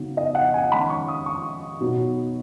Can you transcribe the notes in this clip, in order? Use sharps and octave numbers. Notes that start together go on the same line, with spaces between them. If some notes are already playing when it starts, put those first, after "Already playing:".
Already playing: C#3 F#3 B3 D#4
D#5
F#5
G#5
D#3 G#3 C#4 B5
C#6
D#6
C#6
B2 F#3 B3 D#4